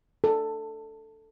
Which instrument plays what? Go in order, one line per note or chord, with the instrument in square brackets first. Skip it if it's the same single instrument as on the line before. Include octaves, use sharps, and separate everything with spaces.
[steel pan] A4